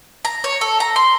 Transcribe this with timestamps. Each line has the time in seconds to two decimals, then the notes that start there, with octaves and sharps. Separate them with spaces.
0.25 A#5
0.44 C#5
0.61 A4
0.80 A#5
0.96 C6